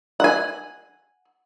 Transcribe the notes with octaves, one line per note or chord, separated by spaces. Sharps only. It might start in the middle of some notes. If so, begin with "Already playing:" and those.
F#5 G#5